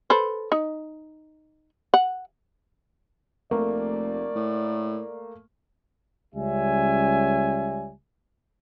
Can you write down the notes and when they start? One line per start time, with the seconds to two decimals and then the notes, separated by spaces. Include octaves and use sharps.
0.10 A4 B4 C5
0.52 D#4
1.94 F#5
3.51 F1 A3 A#3 D5
4.36 A2
6.35 C#2 G3 C#4 E5 G#5